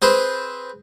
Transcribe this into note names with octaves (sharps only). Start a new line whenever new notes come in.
C4 G#4 B4 C5